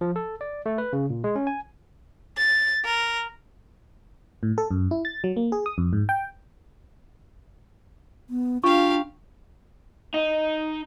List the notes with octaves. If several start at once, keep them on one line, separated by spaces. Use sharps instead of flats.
F3
A4
D5
A3
B4
C#3
A#2
G#3
C#4
G#5
A6
A#4
A2
A4
F#2
E4
A6
F#3
A#3
G#4
D#6
F2
G#2
G5
B3
D4 F4 G4 F5 C#6
D#4